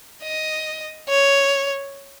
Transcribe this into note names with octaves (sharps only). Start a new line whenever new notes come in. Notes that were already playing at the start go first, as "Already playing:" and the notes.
D#5
C#5